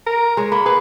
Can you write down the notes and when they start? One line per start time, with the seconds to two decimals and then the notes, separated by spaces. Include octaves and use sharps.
0.07 A#4
0.37 G#3 C#5
0.52 A#3 B5
0.66 G#4 B4